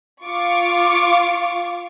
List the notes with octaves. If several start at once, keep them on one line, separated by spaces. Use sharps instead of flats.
F4 F5 C#6 D6